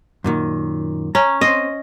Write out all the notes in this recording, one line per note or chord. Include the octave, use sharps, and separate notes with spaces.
F#2 A#2 D#3
C#4 A#5
C4 C5 D#5